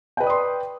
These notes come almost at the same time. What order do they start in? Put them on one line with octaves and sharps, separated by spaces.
G5 B4 D5 D#6 C6